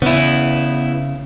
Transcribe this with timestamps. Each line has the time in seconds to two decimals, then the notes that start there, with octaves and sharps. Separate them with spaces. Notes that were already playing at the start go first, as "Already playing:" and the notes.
0.02 C#3 B3 E4